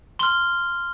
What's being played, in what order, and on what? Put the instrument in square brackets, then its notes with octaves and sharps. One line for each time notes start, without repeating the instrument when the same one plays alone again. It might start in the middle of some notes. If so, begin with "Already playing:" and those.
[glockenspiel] C6 F6 G7